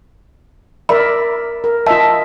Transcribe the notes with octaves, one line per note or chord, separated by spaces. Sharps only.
A#4 D5 E5 B5
A#4
F4 D#5 E5 A5